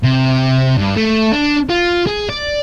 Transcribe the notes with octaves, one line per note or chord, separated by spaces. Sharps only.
C3
G2
A3
D4
F4
G#4
D5